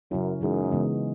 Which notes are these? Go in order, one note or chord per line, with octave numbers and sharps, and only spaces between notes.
F#2 C#3 F#3 C#4 E4 A#4
F#2 E3 G#3 D#4 G#4
C#3 E3 G#3 B3